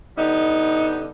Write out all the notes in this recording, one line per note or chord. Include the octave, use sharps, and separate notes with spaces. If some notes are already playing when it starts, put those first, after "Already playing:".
D3 G3 B3 D#4